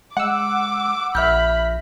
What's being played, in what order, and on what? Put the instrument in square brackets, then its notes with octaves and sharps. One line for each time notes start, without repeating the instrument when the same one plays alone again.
[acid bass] G#3 [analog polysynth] F#5 E6 [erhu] D6
[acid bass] A#1 [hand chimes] E5 F6 G6 [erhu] B5